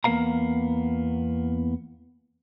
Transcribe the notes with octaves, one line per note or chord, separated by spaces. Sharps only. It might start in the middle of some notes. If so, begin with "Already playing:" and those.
E2 A#3 B3 A#4 F5 A#5